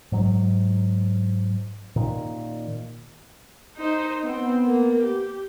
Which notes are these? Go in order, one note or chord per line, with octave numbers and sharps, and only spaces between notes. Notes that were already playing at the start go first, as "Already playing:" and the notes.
G#2 F#3
A#2 D#3
D#4 C5
B3 C4
A#3
G4